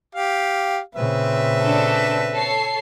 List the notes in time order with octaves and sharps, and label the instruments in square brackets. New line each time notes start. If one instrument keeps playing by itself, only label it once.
[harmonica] G4 F5
[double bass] A#2 C#3 [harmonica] C4 B4 E5
[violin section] D4 A4
A4 C#5 C7